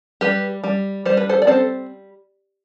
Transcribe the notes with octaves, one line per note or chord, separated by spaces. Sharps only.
G3 G4 B4
G3
G3 C5
B4
A4 C5
D5
C4 A4 C5